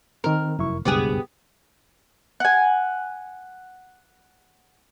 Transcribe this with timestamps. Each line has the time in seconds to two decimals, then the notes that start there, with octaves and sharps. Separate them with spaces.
0.24 D#3 C4 A#4
0.59 F1 F#2 E4 C#6
0.85 F#1 C#2 G2 B2 B3 G4 G#4
2.40 F#5 G#5